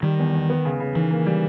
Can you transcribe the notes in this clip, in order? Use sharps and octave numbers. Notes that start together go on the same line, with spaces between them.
D#3 G3
E2
E2
B3
C#3
C#3
D#3 E3
A#3
G3